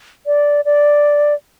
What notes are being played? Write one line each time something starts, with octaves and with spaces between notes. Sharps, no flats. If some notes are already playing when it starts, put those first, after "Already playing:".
D5
D5